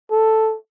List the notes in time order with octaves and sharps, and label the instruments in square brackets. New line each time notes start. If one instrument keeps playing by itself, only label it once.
[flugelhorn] A4